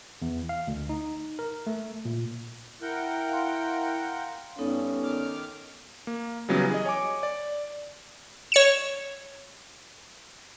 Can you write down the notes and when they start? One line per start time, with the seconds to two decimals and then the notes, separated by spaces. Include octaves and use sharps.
0.22 E2
0.49 F5
0.67 D2
0.89 D#4
1.39 A#4
1.67 A3
2.05 A#2
2.82 E4 A#4 F#5 G5
3.29 F5 C6
4.59 G2 B3 C#4 D#4 A4
5.03 D#3 D6 F6
6.07 A#3
6.49 C#3 E3 F#3 G3 B3 C#4
6.71 G#4 D#5
6.85 C#5 G#5 D6
7.23 D5
8.52 C#5 C#7 E7